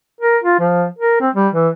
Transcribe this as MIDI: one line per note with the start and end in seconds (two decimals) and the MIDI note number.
0.21 0.38 70
0.44 0.59 65
0.59 0.86 53
0.99 1.19 70
1.21 1.30 60
1.35 1.48 55
1.54 1.69 52